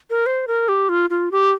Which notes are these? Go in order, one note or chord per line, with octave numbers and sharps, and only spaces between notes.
A#4
C5
A#4
G4
F4
F4
G4